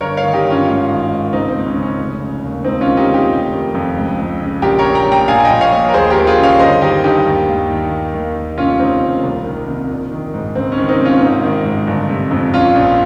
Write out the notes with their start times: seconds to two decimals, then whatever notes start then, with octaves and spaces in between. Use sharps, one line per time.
0.01 G1 A#4 C#5
0.17 C#5 F5
0.23 D#3
0.34 D#4 G4
0.45 G2
0.50 C#4 F4
0.67 G#1
0.89 D#3
1.11 G#2
1.33 C#2 C4 D#4
1.49 C4
1.55 C#2
1.66 C#4
1.77 C#3
1.82 C#4
1.99 F1
2.21 C#3
2.43 D#2
2.64 C#2 C4 D#4
2.81 C#4 F4
2.86 D#3
2.97 D#4 G4
3.08 C3
3.14 D#4 G4
3.31 F1
3.52 D#3
3.74 F2
3.96 C#2
4.18 C#2
4.40 C#3
4.62 A#1 G4 A#4
4.79 A#4 C#5
4.84 A#1
4.95 G5 A#5
5.06 A#2
5.12 G5 A#5
5.28 A#1 F5 G#5
5.45 D#5 G5
5.50 A#1
5.61 C#5 F5
5.72 A#2
5.89 A#4
5.94 D#2 G#4 C5
6.10 G4 A#4
6.17 D#2
6.27 F4 G#4
6.38 C#3
6.43 C#5 F5
6.59 G1 C5 D#5
6.82 D#3 D#4 G4
7.04 G2 D#4 G4
7.26 D#2
7.48 D#2
7.70 D#3
7.92 D#2
8.14 D#2
8.35 D#3
8.58 F1 C#4 F4
8.80 C#3 C4 D#4
9.02 D#2
9.24 C2
9.46 D#3
9.68 C3
9.90 A#1
10.12 D#3
10.34 G#2
10.55 C#2 C4
10.72 C#4
10.77 D#3
10.89 C4 D#4
10.99 C3
11.05 C#4 F4
11.21 G#1 C4 D#4
11.44 D#3
11.65 G#2
11.87 G1
12.09 C3
12.31 F2
12.53 A#1 C#4 F4
12.75 A#1